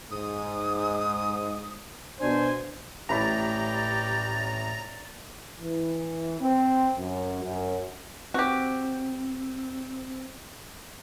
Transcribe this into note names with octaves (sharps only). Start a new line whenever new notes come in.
G#2 D#6
B2 D4 C5 G#5
A1 A2 G4 D5 A#5 B5
E3
C4
F#2
F#2
C4 F#4 G4